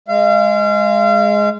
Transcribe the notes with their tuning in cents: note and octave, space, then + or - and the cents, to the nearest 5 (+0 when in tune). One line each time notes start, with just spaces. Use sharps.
G#3 +0 F5 -35